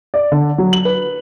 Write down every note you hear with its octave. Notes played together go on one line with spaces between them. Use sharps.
D5
D3
F#3
F#7
B4